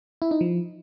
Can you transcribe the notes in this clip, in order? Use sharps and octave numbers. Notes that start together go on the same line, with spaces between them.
E4
D#4
F3